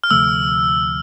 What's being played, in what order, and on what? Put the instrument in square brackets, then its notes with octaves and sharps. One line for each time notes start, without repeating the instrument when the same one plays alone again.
[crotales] F6
[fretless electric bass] D2 C3 F3 A3 [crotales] E6